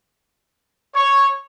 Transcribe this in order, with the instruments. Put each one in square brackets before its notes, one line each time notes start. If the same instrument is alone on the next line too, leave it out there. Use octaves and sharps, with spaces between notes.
[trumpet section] C#5